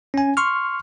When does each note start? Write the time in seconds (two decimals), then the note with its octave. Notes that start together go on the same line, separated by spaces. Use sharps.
0.14 C#4 G#5
0.37 C6 C#6 F6